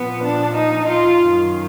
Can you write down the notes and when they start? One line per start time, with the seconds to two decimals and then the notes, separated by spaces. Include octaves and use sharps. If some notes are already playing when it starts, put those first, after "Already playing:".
Already playing: A#2 F3 B3
0.24 D4
0.55 D#4
0.87 F4
1.20 F#2 D#3